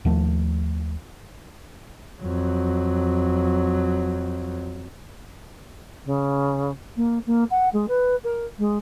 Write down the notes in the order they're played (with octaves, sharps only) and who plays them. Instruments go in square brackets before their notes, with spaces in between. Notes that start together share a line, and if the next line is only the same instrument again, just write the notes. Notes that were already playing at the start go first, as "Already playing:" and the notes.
[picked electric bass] D#2 F3 A3
[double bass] F2 F#3
[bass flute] C#3
A#3
A#3
F#5
G#3
B4
A#4
G#3